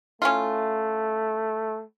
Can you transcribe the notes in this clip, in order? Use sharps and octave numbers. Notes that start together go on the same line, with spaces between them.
A3 C#4 E4 F4